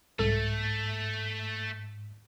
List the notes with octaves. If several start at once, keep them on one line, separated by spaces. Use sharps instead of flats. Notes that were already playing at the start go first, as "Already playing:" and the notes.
C2 G#2 A3 A4